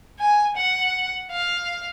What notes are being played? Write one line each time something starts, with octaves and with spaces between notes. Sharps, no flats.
G#5
F#5
F5